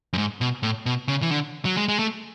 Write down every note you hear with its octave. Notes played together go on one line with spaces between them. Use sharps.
F#2
G#2
B2
A2
B2
C#3
E3
D3
F#3
G#3
G#3
A3